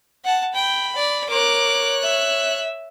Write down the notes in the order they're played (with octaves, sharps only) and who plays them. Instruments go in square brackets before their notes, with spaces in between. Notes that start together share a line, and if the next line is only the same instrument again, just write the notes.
[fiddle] F#5 A5
[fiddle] G5 [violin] B5
[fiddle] D5
[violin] A#4 D6 [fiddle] C#5 F#6
[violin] E5